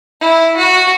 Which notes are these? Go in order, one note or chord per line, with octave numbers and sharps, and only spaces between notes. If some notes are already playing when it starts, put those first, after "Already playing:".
E4
F#4